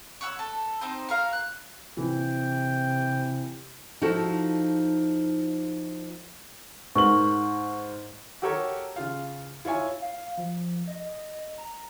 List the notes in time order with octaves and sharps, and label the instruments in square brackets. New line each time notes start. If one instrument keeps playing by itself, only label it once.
[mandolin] C#5 F#5 E6
A4
C4 D#4 C5
F#4 A#4 F5
F#6
[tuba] C3 [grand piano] E3 [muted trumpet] G5
[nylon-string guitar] F3 D#4 E4 F#4 A4
[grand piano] G#2 A#4 F#7 [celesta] C#6
[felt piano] F#4 G4 A4 A#4 C#5
C#3 F4 F5
E4 F4 C#5 G#5
[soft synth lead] F5
F3
D#5
A#5